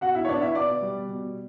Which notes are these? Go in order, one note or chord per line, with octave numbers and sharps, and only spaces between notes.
B2 F#4 F#5
E4 E5
C#5
B3 D4 D5
E4 E5
B2 D5 D6
G3
B2